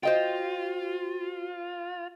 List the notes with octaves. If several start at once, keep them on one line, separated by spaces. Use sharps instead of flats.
F4 F#4 C5 D#5 G5